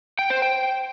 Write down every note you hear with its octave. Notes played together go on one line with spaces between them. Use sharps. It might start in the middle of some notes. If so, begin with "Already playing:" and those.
G5
C5
G5